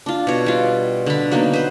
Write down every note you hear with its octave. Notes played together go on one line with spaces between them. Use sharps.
D4 F4
B2 C#5
G3 F4
D3 B5
F#3 A#3 B3 D#4
B4 C5